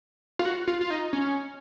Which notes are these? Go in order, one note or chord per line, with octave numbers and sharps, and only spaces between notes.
F4
F#4
F4
F4
D#4
C#4